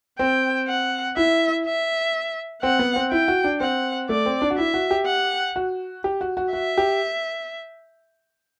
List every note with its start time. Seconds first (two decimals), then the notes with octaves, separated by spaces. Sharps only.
0.19 C4 G5
0.68 F#5
1.17 E4 E5
1.66 E5
2.63 C4 F#5
2.79 B3
2.96 C4
3.12 E4 G5
3.28 F#4
3.44 D4
3.60 C4 F#5
4.09 A3 D5
4.26 C4
4.42 D4
4.51 F#4
4.58 E4 E5
4.74 F#4
4.91 G4
5.06 F#5
5.56 F#4
6.04 G4
6.21 F#4
6.37 F#4
6.53 F#4 E5
6.78 G4